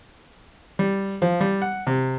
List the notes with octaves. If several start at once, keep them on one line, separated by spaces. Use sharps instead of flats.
G3
F3
G3
F#5
C3